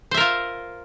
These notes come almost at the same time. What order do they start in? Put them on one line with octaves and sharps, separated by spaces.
C5 E5 A#4 F4